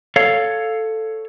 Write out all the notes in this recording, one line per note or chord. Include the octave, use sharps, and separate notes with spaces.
A4 C#5 F5